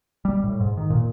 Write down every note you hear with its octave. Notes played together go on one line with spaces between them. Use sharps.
G3
A2
G#2
D#3
A#2